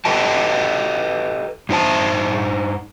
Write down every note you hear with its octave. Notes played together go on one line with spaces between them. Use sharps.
G4 A4 B4 D#5 G5 A5
G2 D#4 C5 A5